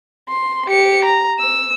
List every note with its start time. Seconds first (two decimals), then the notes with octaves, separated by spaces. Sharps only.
0.29 C6
0.68 G4 C#7
1.05 A#5
1.39 E6